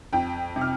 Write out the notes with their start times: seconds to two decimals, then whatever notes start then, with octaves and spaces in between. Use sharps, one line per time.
0.13 F2 G5
0.56 C3
0.61 F6